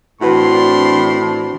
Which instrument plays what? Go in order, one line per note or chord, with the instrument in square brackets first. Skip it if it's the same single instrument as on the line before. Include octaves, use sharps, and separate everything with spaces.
[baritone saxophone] A2 [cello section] E3 C4 D4 [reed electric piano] E4 F#4 B4 [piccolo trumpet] C6